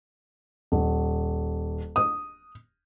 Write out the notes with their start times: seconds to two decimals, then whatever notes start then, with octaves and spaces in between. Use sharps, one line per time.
0.72 D#1
1.96 D#6